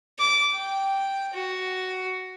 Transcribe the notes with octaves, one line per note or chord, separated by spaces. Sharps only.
D6
G5
F#4